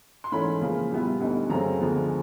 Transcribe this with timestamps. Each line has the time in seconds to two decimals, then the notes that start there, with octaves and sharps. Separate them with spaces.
0.24 C6
0.32 G#2 E3 A3 C#4 B5
0.61 C#3 F3 A#3
0.91 A#2 G3 B3 E4
1.20 D2 D3 G3 B3 D#4
1.50 F#2 C#3 F#3 A3 C4 A#5
1.79 D2 D3 F3 G#3 B3